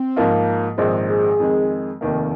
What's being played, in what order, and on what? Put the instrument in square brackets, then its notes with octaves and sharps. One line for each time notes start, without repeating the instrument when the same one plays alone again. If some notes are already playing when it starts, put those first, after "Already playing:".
Already playing: [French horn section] C4
[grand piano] G#2 F3 A#3 F4
[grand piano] A#1 G#2 D#3 G#3 C4 [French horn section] G#4
[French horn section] G#4
[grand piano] F2 D#3 G#3
F1 D#2 D#3 A#3